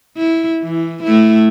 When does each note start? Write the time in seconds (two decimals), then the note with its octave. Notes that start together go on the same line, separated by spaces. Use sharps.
0.17 E4
0.63 E3
1.04 A3 E4